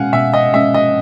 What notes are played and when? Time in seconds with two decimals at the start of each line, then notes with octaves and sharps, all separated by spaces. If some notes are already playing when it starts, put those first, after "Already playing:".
Already playing: B2 G#3 C#4 F5 F#5 G#5
0.13 B2 E5
0.34 D#5
0.54 G#3 C#4 E5
0.74 D#5